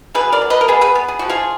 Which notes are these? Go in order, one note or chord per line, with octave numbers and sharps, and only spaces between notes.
B2 G#4 B4
A#4 D5
F#3
B4 D#5
A#4
B3 G#4 B4
G#4 B4
B3
G#4
F3 F#4
F4 G#4